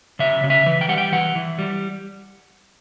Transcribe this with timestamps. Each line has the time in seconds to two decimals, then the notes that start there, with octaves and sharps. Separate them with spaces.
0.19 C#3 E5
0.43 C#3
0.50 E5
0.66 E3
0.81 G5
0.88 G3 F#5
0.97 G5
1.12 E3 F#5
1.35 E3
1.59 G3